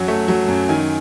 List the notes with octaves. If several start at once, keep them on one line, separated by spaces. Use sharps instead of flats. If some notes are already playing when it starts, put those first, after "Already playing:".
Already playing: F#2 F#3 F#5
A3
F#3
F#2
D#3 G#5